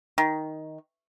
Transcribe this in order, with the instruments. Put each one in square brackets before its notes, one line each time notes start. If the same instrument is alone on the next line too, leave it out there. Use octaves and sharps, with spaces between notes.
[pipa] D#3